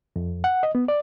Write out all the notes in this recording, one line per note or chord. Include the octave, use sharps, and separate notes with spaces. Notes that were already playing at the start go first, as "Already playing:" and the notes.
F2
F#5
D#5
B3
D5